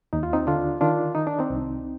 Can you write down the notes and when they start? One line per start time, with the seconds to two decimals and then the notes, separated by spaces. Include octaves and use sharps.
0.13 D#2 D#4
0.23 F4
0.33 C4 D#4
0.47 D3 D4 F4
0.81 D#3 D4 F4
1.15 D#3 D#4
1.27 D4
1.39 C4 D#4
1.50 C2